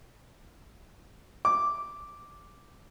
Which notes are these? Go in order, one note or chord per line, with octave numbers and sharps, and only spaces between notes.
D6